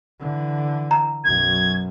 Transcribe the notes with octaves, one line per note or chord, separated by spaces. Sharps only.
D3 E3
A#5
B1 F#2 G#6